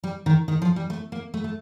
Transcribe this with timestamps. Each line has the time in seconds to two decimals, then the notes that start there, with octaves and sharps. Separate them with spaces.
0.04 G3
0.26 D#3
0.48 D#3
0.62 F3
0.76 G3
0.90 A3
1.12 A#3
1.34 A3
1.44 A3